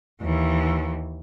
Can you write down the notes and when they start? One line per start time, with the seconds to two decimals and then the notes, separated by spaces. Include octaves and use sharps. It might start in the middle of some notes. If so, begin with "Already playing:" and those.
0.22 D#2 E3